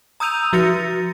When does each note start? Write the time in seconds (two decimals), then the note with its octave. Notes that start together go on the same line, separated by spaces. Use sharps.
0.20 A#5 D#6 E6 G6 D#7 F7
0.53 F3 F#4 A6 A#6 C#7